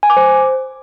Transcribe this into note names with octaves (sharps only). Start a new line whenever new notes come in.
G#5
D6
C5